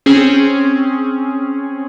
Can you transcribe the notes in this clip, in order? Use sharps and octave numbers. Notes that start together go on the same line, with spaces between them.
C4 C#4 G#4